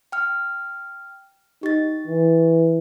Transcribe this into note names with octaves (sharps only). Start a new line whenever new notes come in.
G5 F6
D#4 G4 A6
E3